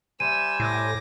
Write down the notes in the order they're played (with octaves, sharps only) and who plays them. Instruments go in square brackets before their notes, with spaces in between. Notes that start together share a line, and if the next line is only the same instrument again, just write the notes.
[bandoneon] G3 C5 G#5 [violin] E5 E6 [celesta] D#7
[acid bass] A2 [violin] D6 A#6